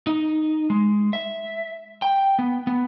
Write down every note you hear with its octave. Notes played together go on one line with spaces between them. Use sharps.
D#4
G#3
E5
G5
B3
B3